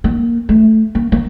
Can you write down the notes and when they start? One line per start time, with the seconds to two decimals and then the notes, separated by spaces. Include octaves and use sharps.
0.04 A#3
0.49 A3
0.95 A#3
1.12 A#3